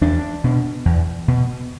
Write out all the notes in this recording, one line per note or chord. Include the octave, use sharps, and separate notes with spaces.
E2 D4
B2
E2
B2